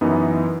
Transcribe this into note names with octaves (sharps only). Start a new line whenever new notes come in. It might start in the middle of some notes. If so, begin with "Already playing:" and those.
F#2 E3 B3 D#4